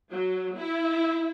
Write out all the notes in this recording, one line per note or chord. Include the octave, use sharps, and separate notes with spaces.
F#3
E4